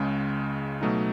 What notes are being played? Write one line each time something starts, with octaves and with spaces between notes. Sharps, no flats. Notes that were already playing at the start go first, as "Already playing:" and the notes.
Already playing: C#2 C#3 G#3
B2 F#3 A3 D#4